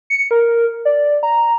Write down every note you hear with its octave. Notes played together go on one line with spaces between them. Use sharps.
C#7
A#4
D5
A#5